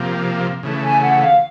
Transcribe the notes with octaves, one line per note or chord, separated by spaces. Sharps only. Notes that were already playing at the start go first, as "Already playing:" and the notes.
Already playing: C3 F3 A#3
C#3 E3 A3
G#5
F#5
F5